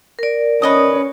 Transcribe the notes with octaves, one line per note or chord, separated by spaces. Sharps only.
A#4 D5
C#4 B4 C#5 D#5 D#6